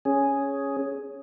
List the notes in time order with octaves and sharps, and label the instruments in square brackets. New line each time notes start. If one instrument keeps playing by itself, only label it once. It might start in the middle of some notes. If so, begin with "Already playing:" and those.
[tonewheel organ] C#4 G#4